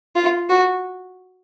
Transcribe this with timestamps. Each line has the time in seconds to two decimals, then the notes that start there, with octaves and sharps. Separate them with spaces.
0.16 F4
0.50 F#4